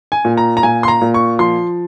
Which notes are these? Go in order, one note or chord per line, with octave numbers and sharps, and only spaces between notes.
G#5
A#2
A#5
A#5
A#2 G#5
C6
A#5
A#2
C#6
F3 C6